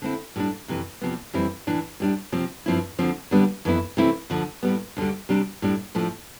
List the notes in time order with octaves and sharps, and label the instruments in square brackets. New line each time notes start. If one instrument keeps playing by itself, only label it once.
[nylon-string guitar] D3 A3 C4 E4
A2 G3 D4
F2 C3 E3
E2 C3 F3 B3
F2 E3 G3 C4 E4
A2 E3 A3 D4
A2 G3 D4
C3 F3 C4
G2 F3 C4 E4
D2 D3 F3 C4
D3 G3 B3 D4
F2 E3 B3 E4
C3 E3 A3 C4 E4
D2 D3 F3
A2 G3 B3
D2 D3 G3
C3 G3 D4
A2 G3 D4
A2 F3 A3 D4